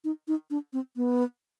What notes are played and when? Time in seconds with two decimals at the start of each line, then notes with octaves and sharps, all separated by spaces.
0.04 D#4
0.28 D#4
0.50 D4
0.73 C4
0.96 B3